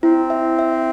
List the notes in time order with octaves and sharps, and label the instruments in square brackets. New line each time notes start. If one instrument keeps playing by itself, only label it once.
[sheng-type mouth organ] C4 [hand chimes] E4
[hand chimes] E5
E5